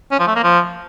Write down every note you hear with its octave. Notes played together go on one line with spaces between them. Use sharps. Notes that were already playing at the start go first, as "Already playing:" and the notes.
C#4
F3
A3
A#3
F3